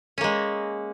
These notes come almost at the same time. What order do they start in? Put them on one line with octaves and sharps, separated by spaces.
C#4 A#3 G#3